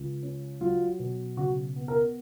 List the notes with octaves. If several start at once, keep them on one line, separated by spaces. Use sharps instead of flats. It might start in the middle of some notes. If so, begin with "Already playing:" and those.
Already playing: C#2
C#4
F#3 F4
B2
C#3 F#4
B3
A#4